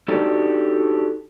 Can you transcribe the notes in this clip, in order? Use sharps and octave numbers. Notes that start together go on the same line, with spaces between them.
D4 D#4 F#4 G4 A4 C5